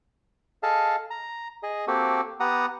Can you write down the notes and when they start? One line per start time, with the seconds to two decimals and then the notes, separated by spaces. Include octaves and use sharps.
0.63 G#4 A4 D#5 F5 A5
1.10 A#5
1.63 G#4 D#5
1.88 A#3 C4 F#4 G4 A4
2.40 B3 G4 F#5 A#5 D#6